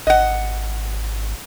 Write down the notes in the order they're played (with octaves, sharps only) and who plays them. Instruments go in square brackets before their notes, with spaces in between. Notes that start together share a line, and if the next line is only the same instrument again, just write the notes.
[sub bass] G#1 [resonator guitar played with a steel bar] D#5 F#5